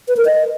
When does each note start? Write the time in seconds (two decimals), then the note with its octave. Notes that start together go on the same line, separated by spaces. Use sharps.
0.08 B4
0.17 A#4
0.25 D#5